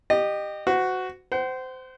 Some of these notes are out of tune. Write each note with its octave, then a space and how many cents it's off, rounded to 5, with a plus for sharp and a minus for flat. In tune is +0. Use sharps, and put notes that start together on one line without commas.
G4 +0 D#5 -25
F#4 +0 C5 -40
C5 -20 F#5 +40